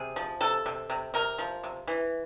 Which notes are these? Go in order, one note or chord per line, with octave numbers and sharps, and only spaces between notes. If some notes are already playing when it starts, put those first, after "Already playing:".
Already playing: C3 G#4
F3
C3 A4
C3
C3
C3 A#4
F3
C3
E3